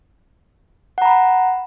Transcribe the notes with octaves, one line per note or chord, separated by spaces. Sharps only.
F#5 A#5 B5